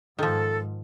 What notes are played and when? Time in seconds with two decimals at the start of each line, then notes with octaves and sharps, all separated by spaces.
0.19 G#2 D#3 F3 A4